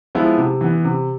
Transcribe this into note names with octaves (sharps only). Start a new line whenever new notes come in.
F3 G#3 B3 E4
C3
E3 B3
C3